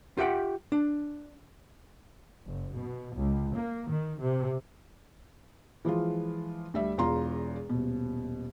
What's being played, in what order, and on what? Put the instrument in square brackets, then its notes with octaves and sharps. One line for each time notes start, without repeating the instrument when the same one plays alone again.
[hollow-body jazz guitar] F4 G4 E5 F#5 G5
D4
[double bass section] F#1
B2
C#2
A#3
D#3
C3
[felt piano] E3 F3 G#3 F4
D2 G3 E5
E1 E2 F4 A#5 C6
D#1 B2